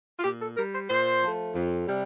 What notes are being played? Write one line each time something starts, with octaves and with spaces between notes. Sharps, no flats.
F4
A#2 G4
A4
G3 A#4
C5
A#2 C5
F3 A3
F2
C3 G3